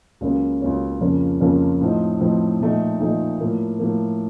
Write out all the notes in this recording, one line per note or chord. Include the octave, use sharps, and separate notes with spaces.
C#2 C#3 F#3 A#3 C#4
C#2 C#3 F#3 A#3 C#4
F2 C#3 F3 A#3 C#4
F2 C#3 F3 A#3 C#4
A2 F3 C4 D#4
A2 F3 C4 D#4
A#2 F3 A3 D#4
A#2 F3 A3 D#4
A2 F3 A#3
A2 F3 A#3